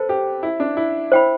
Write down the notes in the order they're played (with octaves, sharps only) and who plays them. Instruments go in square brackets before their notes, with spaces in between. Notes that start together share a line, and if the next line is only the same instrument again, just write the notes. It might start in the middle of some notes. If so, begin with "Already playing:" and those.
Already playing: [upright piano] A4 B4 [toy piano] C5
[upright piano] G4
E4
D4
E4
[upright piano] E4 [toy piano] C5 G5 B5